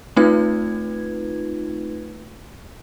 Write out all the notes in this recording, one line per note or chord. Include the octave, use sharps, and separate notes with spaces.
A3 C4 D#4 F4 B4 G#6